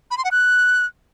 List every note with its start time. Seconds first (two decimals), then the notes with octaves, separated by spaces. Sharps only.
0.11 B5
0.18 C6
0.25 F#5
0.31 F#6